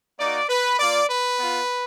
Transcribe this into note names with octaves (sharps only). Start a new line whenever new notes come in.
A#3 D#4 F#4 D5
B4
A#3 F4 D5
B4
B3 F4